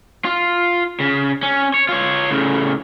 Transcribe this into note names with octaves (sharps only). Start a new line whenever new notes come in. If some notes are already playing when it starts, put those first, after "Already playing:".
F4
C#3
C#4
C#5
F4 C#5
A2 C#3